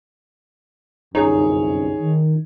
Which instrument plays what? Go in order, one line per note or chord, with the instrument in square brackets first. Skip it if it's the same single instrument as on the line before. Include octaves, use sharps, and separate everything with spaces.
[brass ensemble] G1 C2 F#2 [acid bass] D#4 [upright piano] G#4 C#5
[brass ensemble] D#3